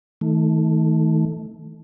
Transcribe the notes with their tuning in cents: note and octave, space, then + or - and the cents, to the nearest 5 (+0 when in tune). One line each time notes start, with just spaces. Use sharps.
D#3 +45 A3 +0